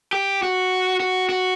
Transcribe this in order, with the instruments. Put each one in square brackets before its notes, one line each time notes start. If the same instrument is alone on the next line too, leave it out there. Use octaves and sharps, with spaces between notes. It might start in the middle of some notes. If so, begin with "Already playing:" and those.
[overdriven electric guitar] G4
F#4
F#4
F#4